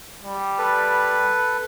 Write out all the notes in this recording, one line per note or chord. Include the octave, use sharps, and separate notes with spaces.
G3
A4 B4